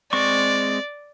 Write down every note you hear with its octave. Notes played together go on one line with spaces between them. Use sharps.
G#3 C4 D5 C#6